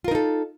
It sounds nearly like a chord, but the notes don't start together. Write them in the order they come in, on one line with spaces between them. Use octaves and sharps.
F4 A#4 D#4 A4